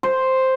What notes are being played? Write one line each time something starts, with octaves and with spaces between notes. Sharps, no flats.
C5